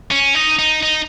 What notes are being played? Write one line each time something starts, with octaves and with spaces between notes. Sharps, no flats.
C#4
D#4
D#4
D#4